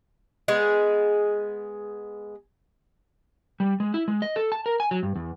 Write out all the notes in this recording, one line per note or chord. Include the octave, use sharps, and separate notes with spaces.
G#3 B3 G#4
G3
G#3
E4
G#3
D#5
A4
A5
A#4
G#5
F#3
G2
E2